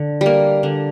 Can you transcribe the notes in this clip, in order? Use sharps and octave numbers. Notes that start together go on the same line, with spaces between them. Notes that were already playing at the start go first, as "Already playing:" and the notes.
Already playing: D3
G3 A#3
D3